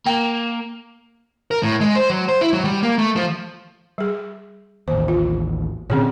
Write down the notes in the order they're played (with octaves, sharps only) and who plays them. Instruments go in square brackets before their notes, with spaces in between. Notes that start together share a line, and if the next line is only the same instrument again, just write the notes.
[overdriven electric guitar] A#3 [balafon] G5
[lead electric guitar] A#4
A2
G#3
C5
F#3
C5
E4
F#3
G3
A#3
A3
F3
[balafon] G3 G#4
[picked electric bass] A1 D#2 [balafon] C5
[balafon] F4
[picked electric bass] A#2 D3 C4 [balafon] C#4 G#4 C#5